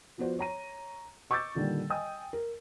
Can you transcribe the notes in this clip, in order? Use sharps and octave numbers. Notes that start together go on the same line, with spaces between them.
F3 B3 F4 F#4 C5 D5
C#5 A#5 D#7
D#5 C#6 D6 E6 G6 A6
A#2 D3 D#3 G3
D#5 G5 G#5 D#6
A#4